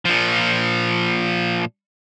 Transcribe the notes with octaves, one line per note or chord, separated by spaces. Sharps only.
A#2 F3